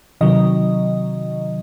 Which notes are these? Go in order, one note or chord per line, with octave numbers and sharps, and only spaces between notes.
C3 D#3 F#3 D#5